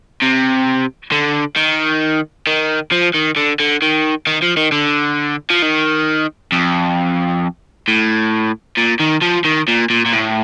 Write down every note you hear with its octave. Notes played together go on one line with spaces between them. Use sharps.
C3
D3
D#3
D#3
F3
D#3
D3
D3
D#3
D#3
F3
D#3
D3
F3
D#3
F2
A2
A#2
D#3
F3
D#3
A#2
A#2
A#2
A2